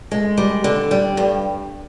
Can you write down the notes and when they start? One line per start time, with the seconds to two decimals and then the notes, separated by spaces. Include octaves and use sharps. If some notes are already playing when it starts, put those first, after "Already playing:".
0.12 G#3
0.38 G3
0.64 D3
0.91 G3
1.17 G2